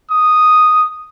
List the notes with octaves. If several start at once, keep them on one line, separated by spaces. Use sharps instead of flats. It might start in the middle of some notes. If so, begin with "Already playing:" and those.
D#6